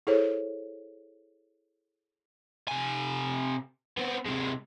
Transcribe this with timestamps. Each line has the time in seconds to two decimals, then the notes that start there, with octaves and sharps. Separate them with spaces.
0.07 E4 G#4 A4 C5 C#5
2.68 C3 G#5
3.98 B3 C4
4.26 C3 G#3